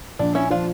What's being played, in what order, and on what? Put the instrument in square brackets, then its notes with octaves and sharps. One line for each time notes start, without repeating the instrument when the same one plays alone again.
[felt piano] A#1 [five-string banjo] D4
[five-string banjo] C#4 E4
[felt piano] F3 [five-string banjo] D4 F4